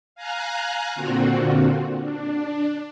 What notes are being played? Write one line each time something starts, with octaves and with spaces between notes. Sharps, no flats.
F5 G#5 A#5 F#6
A#2 D3 C4 F4 F#4
D4